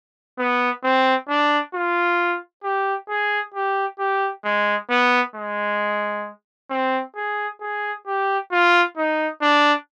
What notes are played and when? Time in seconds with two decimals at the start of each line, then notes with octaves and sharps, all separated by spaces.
0.39 B3
0.84 C4
1.28 D4
1.74 F4
2.64 G4
3.09 G#4
3.54 G4
3.99 G4
4.44 G#3
4.90 B3
5.36 G#3
6.70 C4
7.16 G#4
7.61 G#4
8.07 G4
8.52 F4
8.97 D#4
9.42 D4